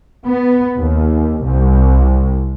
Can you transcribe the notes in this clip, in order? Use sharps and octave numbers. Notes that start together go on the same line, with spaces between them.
B3
D#2
C2